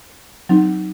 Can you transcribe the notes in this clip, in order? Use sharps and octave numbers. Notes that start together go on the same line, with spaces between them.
F#3 C4 D#4